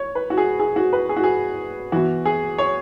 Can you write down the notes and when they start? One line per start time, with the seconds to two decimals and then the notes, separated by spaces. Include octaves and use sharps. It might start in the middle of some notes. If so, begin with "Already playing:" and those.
Already playing: C#5
0.15 B4
0.30 F#4
0.37 G#4
0.60 G#4
0.76 F#4
0.93 B4
1.09 G#4
1.16 F#4
1.24 G#4
1.92 E3 B3 F#4
2.25 G#4
2.58 C#5